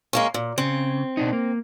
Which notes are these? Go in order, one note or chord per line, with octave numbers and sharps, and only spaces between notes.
G#3 A#3 C#4
A#2
C#3 C4
B2 D4 D#4
A#3